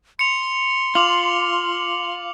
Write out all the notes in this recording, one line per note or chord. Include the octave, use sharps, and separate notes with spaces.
C6 C#7 F7
F4 D6 F7 F#7